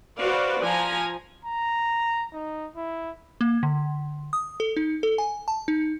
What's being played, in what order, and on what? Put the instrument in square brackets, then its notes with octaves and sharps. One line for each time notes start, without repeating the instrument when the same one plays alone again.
[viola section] F#4 B4 C5 D5 F5
F3 G#5 A#5
[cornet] A#5
D#4
E4
[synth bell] A#3
D3
D#6
A4
D#4
A4
G#5
A5
D#4